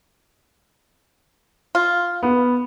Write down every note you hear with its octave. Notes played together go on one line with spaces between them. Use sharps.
F4
B3